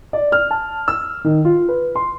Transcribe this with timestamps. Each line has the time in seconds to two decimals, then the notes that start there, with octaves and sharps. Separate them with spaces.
0.13 D5
0.32 F6
0.51 A5
0.88 E6
1.24 D#3
1.45 F4
1.69 B4
1.96 C6